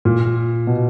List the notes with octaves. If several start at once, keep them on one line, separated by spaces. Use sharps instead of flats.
A#2
B2